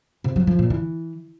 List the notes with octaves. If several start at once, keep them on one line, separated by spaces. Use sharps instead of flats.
C3
F#3
F3
A#2
E3